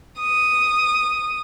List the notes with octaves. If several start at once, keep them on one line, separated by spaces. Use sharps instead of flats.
D#6